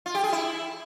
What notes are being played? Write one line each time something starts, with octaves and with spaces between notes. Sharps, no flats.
F4
G4
G#4
E4